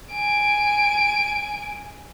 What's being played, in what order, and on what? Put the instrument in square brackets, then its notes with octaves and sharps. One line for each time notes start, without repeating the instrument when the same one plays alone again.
[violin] G#5 D7